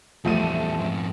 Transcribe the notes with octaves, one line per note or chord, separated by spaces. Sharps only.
E2 F3 G3 A3 D#7
F2 G#2